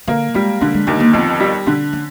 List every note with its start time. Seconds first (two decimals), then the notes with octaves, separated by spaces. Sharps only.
0.08 D3 A#3
0.34 G3 G#3
0.61 D3 A3
0.74 G#3
0.87 D#2 A3
1.00 A#3
1.13 F2 B3
1.40 G3
1.66 D3 C4
1.93 C#4